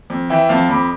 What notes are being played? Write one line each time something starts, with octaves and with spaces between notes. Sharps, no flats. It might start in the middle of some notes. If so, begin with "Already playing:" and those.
F2
E3 E5 G5
F2 F5 A5
F2 B5 D6